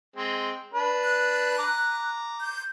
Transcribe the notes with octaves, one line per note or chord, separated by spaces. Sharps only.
G#3 C4
D4 B4
F#6
A#5 D6
G6